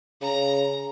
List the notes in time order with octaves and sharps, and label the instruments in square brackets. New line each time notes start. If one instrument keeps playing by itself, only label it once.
[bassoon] C#3 [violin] A#5